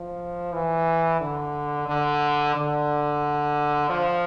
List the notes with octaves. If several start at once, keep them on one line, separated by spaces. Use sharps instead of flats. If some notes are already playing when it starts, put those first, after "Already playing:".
Already playing: F3
E3
D3
D3
D3
F3